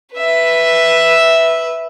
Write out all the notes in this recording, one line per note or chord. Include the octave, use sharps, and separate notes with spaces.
B4 E5